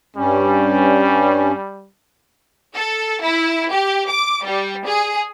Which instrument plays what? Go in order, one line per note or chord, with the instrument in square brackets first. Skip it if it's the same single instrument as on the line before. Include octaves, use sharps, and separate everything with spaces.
[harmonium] G2 C#4 [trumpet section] G3
[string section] A4
E4
G4
D6
G3
G#4